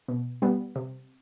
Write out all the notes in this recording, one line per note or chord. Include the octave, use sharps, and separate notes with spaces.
B2
G3 B3
C3